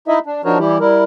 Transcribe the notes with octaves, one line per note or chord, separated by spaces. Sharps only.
D#4 E4 D#5 E5
D4
F3 D4 D#4 F#4 A#4 C#5
E3 G3 E4 G4
G3 E4 A#4